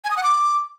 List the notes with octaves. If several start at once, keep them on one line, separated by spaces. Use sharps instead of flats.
G#5
D#6
F#5
D6